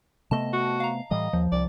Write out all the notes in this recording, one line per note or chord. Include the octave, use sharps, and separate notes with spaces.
C3 A3 B3 D#5 A5
F#4
F5 A#5
A2 E3 G3 D#5
D#2 F3
C2 D5